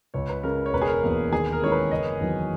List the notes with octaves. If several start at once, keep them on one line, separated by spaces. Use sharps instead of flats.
C#2 C#5
B4
C#3 G#3 A#4
C#5
E1 B4
G#4
A#4
E2 B2 A#3 A#4
D#2 G#4
A#4
D#3 G#3 C#4 E4 C#5
B4
F#1 D#5
E2 D#3 F#3 B3